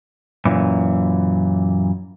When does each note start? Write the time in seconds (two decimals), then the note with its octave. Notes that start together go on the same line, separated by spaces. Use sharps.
0.45 F#2 A#2 E3